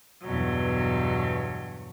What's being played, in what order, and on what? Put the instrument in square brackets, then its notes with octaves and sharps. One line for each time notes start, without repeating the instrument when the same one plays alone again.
[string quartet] E2 G2 B2 F#3